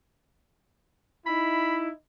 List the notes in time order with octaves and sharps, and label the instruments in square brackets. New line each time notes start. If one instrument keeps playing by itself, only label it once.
[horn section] D#4 E4 [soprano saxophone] B5